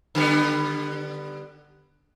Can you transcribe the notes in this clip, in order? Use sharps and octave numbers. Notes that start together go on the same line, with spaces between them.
D3 G3 B3